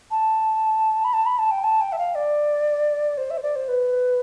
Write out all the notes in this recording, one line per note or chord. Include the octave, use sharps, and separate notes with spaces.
A5
B5
A5
B5
A5
G5
A5
G5
E5
F5
D5
C5
E5
C5
D5
C5
B4